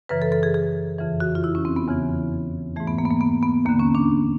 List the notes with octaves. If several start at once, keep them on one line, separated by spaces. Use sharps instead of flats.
F#2 C#3 E3 B4
A4
A4
G#4
G#4
F2 C#3 E3
F#4
F4
E4
C#4
C4
B3
E2 C#3 E3
G#2 E3 A3
B3
A#3
B3
A#3
B3
B3
D#2 D3 A#3
C#4
D4